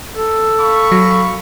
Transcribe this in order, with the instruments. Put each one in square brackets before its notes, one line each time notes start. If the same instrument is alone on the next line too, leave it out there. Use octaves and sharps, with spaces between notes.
[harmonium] A4
[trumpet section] F5 B5 C#6
[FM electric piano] F#3